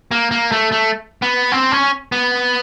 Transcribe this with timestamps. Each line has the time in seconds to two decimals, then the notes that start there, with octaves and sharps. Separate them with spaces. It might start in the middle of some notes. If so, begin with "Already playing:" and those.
0.11 A#3
0.31 A#3
0.52 A3
0.72 A3
1.22 B3
1.52 C4
1.72 C#4
2.12 B3